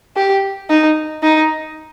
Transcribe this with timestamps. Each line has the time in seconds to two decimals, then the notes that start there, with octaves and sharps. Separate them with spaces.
0.16 G4
0.70 D#4
1.23 D#4